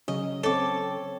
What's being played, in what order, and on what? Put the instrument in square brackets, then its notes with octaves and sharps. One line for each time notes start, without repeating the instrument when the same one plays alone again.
[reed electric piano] C#3 F#3 C#4 [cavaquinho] D#5
[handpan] C4 C#5 [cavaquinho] A4 D6